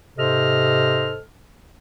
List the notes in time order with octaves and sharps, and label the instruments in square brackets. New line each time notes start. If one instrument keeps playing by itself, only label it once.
[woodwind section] G#2 C3 A4 C5 D#5 F6